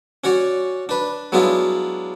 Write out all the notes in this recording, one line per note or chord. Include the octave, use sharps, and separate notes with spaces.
C#4 F#4 C#5 D5
D4 B4
F#3 G#3 B3 D4 E4 F4